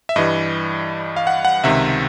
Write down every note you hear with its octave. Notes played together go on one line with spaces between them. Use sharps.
E5
G2 E3 G3 D#5
F5
F#5
F#5
C#2 C3 D#3 E5